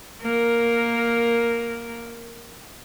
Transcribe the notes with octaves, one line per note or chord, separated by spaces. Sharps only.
A#3 A#4